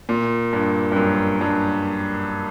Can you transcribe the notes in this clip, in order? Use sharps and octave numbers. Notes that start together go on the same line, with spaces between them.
A#2
G2
G2
F#2
G2